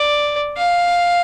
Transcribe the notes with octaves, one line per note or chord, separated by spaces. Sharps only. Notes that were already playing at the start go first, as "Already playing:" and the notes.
Already playing: D5
F5